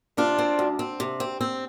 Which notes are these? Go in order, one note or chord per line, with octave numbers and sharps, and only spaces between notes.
C3 D4 F4
C4
D2
C4
C3
C4
C4